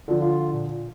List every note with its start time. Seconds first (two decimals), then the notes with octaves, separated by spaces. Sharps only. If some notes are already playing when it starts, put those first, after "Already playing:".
0.08 D3 F3
0.20 F4
0.53 A#2